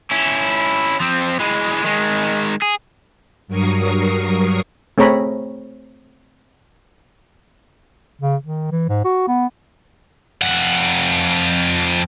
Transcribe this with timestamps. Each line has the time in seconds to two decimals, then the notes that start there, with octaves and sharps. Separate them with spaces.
0.11 C#4 E4
1.00 F3 C4
1.40 E3 G#3
1.84 D#3 G#3
2.62 G#4
3.48 G2 F#3 A#4 C#6 D#6 C7
4.98 A3 C4 G#4 C#5 A#5 B5
8.22 C#3
8.43 D#3
8.71 E3
8.89 G#2
9.05 F#4
9.28 B3
10.42 F2 F#5